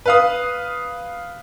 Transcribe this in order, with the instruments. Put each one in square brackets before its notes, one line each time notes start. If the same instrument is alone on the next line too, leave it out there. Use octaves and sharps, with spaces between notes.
[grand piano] B4 F5 D#6